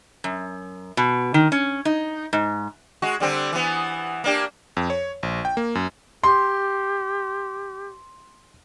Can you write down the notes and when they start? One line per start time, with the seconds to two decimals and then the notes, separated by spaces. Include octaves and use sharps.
0.24 F#2
0.97 B2
1.34 D#3
1.52 C#4
1.85 D#4
2.33 G#2
3.02 G#3 F#4
3.20 D3 G3 C4
3.53 E3 B3
4.24 A#3 D4 G4
4.77 F2
4.90 C#5
5.23 A#1
5.45 G5
5.57 A#3
5.75 F#2
6.24 G4 C6